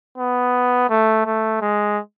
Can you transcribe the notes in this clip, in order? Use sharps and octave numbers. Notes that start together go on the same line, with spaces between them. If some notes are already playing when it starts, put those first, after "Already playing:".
B3
A3
A3
G#3